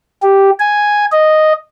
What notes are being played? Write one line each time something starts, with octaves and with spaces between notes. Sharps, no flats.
G4
G#5
D#5